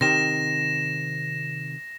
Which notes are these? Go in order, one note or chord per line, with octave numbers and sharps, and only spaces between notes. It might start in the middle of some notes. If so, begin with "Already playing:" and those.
C3 D#3 A#6 E7